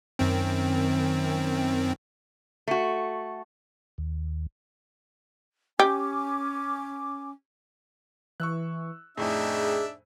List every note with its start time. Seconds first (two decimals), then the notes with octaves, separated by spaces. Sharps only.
0.19 F#2 D#3 C4
2.68 A3 F#4
3.98 D#2
5.80 C#4 G4 G#5 D6
8.40 E3 C#6 E6 F#6
9.17 F2 A2 D4 D#4 G#4 E5